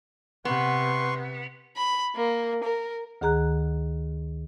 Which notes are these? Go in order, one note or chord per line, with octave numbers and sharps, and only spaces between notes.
C3 B3 B4 C6 C#6
B5
A#3
A#4
D2 D#3 G#4 A#5 F#6